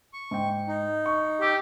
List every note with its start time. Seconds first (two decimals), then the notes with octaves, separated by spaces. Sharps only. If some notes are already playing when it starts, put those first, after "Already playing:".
0.13 C#6
0.31 G#2 G5
0.68 D#4
1.06 C#6
1.42 G4 E6